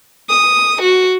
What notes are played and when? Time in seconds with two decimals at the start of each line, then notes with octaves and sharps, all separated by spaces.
0.29 D#6
0.82 F#4